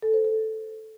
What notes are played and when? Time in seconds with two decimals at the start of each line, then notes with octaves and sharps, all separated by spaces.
0.03 A4
0.14 C5
0.25 A4